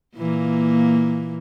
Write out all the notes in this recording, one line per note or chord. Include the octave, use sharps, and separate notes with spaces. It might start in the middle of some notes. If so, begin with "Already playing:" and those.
A#2 E3 A#3